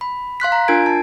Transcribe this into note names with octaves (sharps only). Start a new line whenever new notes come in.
B5
F5 C6 F#6 B6
A#5
D4 F4 A#4 G#5 G#6 D7
A5